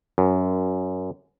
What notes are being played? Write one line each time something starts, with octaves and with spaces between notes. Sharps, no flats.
F#2